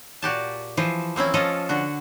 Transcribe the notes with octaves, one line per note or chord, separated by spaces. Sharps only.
A#2 F#4 G4 A5
E3 F3 C5
A#3 C4 C#4 E4
F3 C#4 F4 A4 D#5 F5
D3 F#4